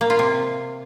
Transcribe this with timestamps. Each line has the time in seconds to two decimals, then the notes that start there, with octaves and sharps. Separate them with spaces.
0.01 A#3
0.10 F4
0.19 C3